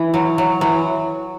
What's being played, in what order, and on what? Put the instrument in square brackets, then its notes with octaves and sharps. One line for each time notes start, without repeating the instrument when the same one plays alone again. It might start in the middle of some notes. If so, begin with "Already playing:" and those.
Already playing: [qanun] E3
[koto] F#3
F#3
[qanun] E3 [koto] F#3